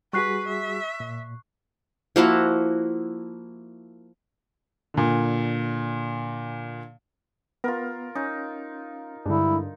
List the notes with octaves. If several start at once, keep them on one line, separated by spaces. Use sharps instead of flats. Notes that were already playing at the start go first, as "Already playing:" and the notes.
G3 F#4 G#4 B4 C#6 F#6 C7
E5
A#2
F3 A#3 E4 F#4
A#2 D3
B3 F4 A#4
C#4 D#4
G2 D3 G#3 D4 E4